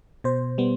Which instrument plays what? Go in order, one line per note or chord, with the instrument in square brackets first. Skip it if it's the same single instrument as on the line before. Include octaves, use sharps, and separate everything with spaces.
[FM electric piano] B2 C5
G3 B3